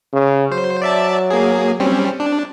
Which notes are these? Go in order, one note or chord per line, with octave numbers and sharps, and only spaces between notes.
C#3
F#3 C5
D5 E5 A5
A#3 G#4
G3 C4 C#4
D4